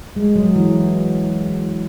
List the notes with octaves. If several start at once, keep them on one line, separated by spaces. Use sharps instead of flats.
G#3
F#3
E3